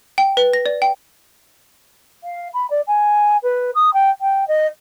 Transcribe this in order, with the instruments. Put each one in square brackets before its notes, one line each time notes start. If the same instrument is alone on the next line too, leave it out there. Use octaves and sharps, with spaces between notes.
[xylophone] G5
B4
A#6
D5
G5
[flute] F5
B5
D5
G#5
B4
D#6
G5
G5
D#5